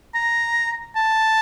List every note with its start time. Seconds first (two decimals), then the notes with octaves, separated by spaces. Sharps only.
0.14 A#5
0.96 A5